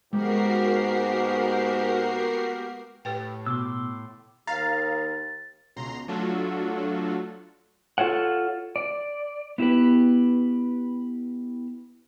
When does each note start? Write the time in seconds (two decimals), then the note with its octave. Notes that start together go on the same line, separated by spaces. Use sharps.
0.13 G#2 G#3 A#3 B3 F#4 G4 A#4 C7
3.05 A2 G4 B4 G5
3.46 B2 C6 D6 E6
4.47 D#2 F5 A#5 A6
5.76 C#2 B2 A#5 C6
6.08 F#3 A3 D4 F4 F#4 A4
7.98 F4 A4 C#5 F#5
8.76 D5
9.58 B3 E4 F4 G4 B4